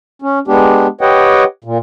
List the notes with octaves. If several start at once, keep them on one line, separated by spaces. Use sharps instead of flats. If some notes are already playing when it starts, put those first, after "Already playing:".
C#4
G#3 B3 D4 G4
G4 B4 C#5 D#5 F#5 G5
A#2